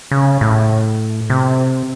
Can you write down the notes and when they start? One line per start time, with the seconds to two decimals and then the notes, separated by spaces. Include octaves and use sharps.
0.11 C#3
0.41 A2
1.30 C3